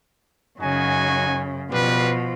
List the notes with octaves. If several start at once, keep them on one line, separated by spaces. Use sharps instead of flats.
F#2 C#3 D#4 F#4 G#5
B2 F3 G3 B3 B4